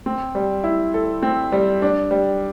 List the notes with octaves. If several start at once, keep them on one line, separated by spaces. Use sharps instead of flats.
C4
G3
E4
A4
C4
G3
D4
G3